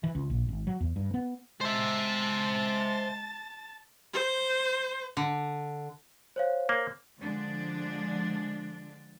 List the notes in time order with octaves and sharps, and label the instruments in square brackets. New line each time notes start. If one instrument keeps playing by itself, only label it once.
[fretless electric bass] E3
C#2
A#1
G#1
F#3
E2
G2
B3
[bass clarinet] G#3 [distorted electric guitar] C5 E5 [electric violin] A5 A6
[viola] C5
[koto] D3
[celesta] C5 C#5 F5
[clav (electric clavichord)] A#3
[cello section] D3 F3 G#3 D4